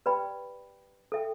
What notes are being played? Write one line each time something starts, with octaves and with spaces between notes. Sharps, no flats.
G4 B4 D5 G5 B5
A4 E5 G5